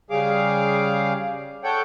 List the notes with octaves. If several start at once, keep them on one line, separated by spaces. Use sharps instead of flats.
C#3 G3 G#4 F5 D6
A4 C#5 F#5 G5